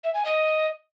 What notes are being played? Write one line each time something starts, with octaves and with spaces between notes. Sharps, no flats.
E5
G#5
D#5